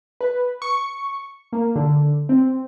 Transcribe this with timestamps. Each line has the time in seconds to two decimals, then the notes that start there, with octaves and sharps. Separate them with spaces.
0.21 B4
0.62 C#6
1.53 A#3
1.76 D3
2.29 C4